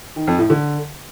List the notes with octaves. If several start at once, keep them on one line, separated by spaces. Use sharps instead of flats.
D#3
F2
A2
D3